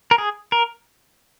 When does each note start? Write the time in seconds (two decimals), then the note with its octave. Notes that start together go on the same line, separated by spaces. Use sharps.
0.11 A#4
0.18 G#4
0.52 A#4